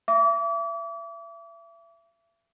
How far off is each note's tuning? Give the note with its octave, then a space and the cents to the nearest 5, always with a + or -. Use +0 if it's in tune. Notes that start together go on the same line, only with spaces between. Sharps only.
E5 +30 D6 -40